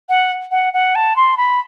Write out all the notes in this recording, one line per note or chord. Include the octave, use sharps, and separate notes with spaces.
F#5
F#5
F#5
A5
C6
B5